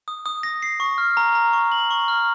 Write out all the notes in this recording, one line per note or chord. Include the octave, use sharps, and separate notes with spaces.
D#6
D#6
A#6
C7
C#6
F6
A#5
A#5
C#6
F#7
C#6
F6